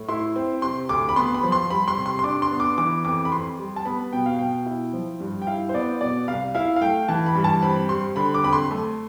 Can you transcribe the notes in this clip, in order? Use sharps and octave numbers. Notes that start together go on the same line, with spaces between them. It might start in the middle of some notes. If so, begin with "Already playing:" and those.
Already playing: A2
E4 C6
C4
C3 C6
D2 D6
B5
B3 C6
B5
F3
C6
G3 B5
C6
C3
C6
C6
D4 D6
C6
B3
D6
E3 D6
F2 D6
B5
F2 C6
G3
A5
B3 B5
B2 G5
F5
B2 G5
E4
F3
G2
G5
E4 F5
C5
B3 D5
B2 D5
C2 F5
E4 F5
F5
A3 G5
E3 A5
B5
G2
A5
C4 B5
G3 C6
D3 B5
D6
F2 B5
C6
A3